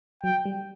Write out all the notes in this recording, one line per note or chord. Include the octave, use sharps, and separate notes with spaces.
F#3 G5
G3